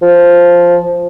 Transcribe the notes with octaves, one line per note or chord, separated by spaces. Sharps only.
F3